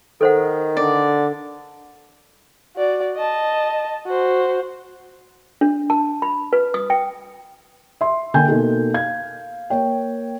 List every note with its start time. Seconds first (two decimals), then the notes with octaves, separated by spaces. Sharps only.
0.21 D#3 A4 C5 F#5
0.77 D3 D5
2.76 F#4 D5
3.16 D#5 A5
4.06 F#4 C5
5.61 D4
5.90 A5
6.22 B5
6.53 B4
6.74 D#6
6.90 G5
8.01 E5 C6
8.34 D3 A#3 G5 G#5 G6
8.48 B2 A#3 D#4 A4
8.94 F5 G#6
9.70 A#3 C#5 G5